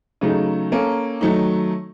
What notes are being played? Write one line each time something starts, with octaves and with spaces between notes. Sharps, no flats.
C#3 F#3 A3 D#4
A#3 C#4 A4
D#3 F#3 A3 D#4